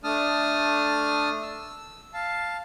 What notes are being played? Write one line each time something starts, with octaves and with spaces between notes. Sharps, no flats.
A3 D4 A5 D#6 F6
E6
F5 A5